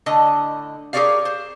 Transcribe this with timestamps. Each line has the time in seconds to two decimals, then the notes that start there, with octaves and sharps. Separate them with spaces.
0.06 A2 D3 D#5 A5
0.93 G4 G#4 A#4 C#5 D5 F5
1.25 C5